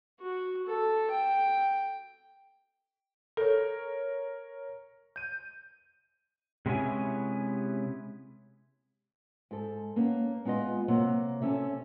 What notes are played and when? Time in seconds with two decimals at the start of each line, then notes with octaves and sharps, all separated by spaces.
0.20 F#4
0.66 A4
1.10 G5
3.37 A4 A#4 C#5
5.16 G6 D#7
6.66 C3 G#3 B3 C#4 E4 G#5
9.51 G#2 A4
9.96 A#3 B3 C#4
10.45 G#3 B3 F4 B4 D#5
10.88 C3 F#3 A#3
11.42 C3 C#4 A4 C#5 E5